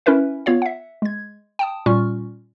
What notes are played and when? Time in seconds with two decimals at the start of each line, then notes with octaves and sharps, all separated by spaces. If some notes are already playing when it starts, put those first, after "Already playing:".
0.06 C#4 E4 A#4 B4 E5
0.46 B3 F4 C#5 F5
0.62 E5 F#5
1.02 G#3 G#6
1.59 G5 A5 D#6
1.86 A#2 G3 C#4 F4 C#6 F6